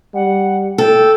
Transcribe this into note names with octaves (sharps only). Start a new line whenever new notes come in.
G3 F#5
A2 A4 G5